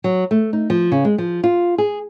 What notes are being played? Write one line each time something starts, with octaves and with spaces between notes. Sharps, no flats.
F#3
A3
D#4
F3
C#3
G#3
F3
F4
G#4